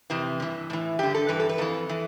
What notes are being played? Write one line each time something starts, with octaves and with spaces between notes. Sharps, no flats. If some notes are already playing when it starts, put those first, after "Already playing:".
F2 C3 E3
G2 E3
A2 E3
G2 D3 G4
A4
G2 E3 B4
A4
B4
F2 E3 A4
E3